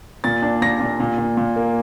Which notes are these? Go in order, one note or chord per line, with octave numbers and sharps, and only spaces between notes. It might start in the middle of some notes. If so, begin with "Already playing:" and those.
A#2 A6
D4
A#2 A#6
A#2
A#2
A#2
A#2
A#3